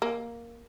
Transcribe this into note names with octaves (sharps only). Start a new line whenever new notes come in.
A#3